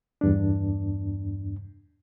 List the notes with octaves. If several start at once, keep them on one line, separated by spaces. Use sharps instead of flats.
E2 G2 D4